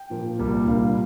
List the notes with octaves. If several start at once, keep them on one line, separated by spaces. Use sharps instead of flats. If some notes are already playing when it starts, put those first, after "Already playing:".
Already playing: G5
A#2 F3 A#3
C2 A#2 G3 A#3
C2 A#2 G3 A#3 F5